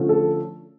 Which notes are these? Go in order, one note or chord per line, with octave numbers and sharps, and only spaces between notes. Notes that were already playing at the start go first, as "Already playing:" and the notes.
Already playing: D3 F3 A3 C#4
A4